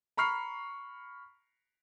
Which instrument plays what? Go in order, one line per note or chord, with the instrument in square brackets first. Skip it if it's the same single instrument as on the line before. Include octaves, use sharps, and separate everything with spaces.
[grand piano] A#5 B5 C#6 F6 C7